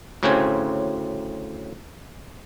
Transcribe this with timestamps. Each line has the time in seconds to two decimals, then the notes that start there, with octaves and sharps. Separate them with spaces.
0.23 D2 A2 C#3 C4 C#5 G#5